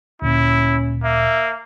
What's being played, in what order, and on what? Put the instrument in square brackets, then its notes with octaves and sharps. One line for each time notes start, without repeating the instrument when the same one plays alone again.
[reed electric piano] D2 A#2 [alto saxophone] C#4 [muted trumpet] E4
[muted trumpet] A#3 [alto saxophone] E5